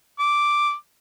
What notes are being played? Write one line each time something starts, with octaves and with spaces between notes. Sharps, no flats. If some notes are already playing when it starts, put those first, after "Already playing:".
D6